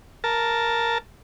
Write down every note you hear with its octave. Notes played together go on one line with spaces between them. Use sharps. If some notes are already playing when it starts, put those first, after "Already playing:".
A#4 A5